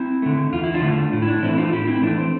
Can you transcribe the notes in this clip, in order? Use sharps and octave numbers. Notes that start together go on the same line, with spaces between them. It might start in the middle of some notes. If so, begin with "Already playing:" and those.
Already playing: C4 E4
D3 A3
E2 F4
E4
D4 F4
D3 A3
A2
E4
D4
E3 A3 C4 E4
D4 F4
A2 E4 G4
C4 E4
E3 A3 D4
C4